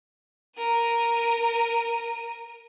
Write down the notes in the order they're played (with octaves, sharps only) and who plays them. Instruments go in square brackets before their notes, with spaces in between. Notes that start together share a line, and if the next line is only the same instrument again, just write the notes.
[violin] A#4 D#7